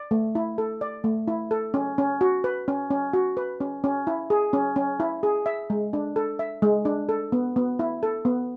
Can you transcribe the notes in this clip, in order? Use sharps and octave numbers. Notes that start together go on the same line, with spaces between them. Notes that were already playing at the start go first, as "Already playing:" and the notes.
Already playing: D5
A3
E4
A4
D5
A3
E4
A4
C#4
C#4
F#4
B4
C#4
C#4
F#4
B4
C#4
C#4
E4
G#4
C#4
C#4
E4
G#4
E5
G#3
D4
A4
E5
G#3
D4
A4
B3
B3
E4
A4
B3